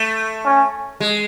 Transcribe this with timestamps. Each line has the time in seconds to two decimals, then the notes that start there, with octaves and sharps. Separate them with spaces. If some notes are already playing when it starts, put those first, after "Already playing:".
Already playing: A3
0.45 C#4
1.00 G#3